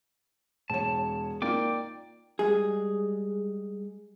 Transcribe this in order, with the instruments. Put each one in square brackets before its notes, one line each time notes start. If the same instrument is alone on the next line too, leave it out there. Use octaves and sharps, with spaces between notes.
[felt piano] E1 C#5 [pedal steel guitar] A5
[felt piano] A#3 D#4 F4 [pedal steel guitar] D5 G5 D6
[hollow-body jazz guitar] G3 G#3 G#4